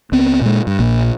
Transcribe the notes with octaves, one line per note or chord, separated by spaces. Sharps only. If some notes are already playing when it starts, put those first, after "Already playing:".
C#2 B3 C4
A#2 G#3
G2
A#1 A#2